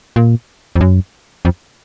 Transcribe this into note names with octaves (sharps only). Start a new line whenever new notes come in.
A#2
F2
F#2
F2